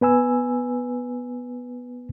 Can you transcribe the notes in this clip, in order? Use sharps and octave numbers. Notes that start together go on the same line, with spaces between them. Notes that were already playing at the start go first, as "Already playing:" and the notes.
B3 B4 G#5 E6